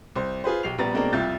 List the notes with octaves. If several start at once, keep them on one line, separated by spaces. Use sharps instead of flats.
C2 C5
F4 G#4 B4 C5
B1 G4 C7 F7
A#1 G3 B3 A#5 A6
B2 G#3 A#3 C4 D4 A#4
C2 F2 F4 E5 G6 A6